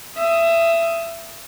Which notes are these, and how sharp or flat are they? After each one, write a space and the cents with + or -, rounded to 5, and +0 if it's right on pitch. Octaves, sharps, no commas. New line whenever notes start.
E5 +20 D#6 +10